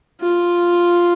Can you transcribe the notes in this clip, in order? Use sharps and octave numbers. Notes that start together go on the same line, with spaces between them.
F4